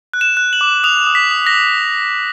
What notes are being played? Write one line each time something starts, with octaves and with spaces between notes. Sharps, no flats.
F#6
E7
F#6
F#7
D6
D#6 F7
D#6
B6
D#6
A#6
D#6